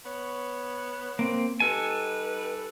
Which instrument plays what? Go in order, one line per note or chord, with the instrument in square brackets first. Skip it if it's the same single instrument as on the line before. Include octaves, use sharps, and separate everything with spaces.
[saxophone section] B3 C#5
[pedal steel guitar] A#3 C4
[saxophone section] G3 D#4 B4 [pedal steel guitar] A4 G#5